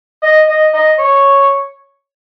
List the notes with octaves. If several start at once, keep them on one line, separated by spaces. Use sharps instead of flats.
D#5
D#5
D#5
C#5